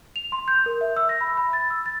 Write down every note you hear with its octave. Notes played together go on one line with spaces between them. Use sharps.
F7
C6
G6
A#4
E5
E6
A#6
B5
B5
A6
E6
A6